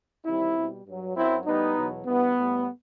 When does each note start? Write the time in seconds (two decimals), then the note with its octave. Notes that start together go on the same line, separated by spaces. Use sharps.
0.25 E2 C3 D#3 G3 C4 E4
0.55 B2 G3
0.85 G2 F#3
1.15 F#2 F#3 C4 E4
1.45 A2 G3 B3 D#4
1.76 E2 B2 F#3
2.06 G2 E3 G3 B3
2.36 A2 G3